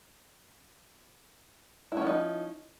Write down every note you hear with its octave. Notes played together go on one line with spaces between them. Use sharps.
F3 C#4 D#4 E4